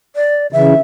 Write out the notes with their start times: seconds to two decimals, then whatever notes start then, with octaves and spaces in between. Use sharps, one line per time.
0.16 D5
0.53 C#3 E3 E5